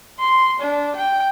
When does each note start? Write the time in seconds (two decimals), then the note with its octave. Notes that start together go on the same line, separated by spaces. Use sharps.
0.20 C6
0.60 D4
0.96 G5